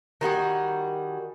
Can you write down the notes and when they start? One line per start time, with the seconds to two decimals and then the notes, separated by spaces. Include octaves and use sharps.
0.21 D#3 G3 F#4 G#4